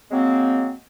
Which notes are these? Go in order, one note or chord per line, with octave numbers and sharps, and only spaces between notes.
F#3 G#3 A#3 C4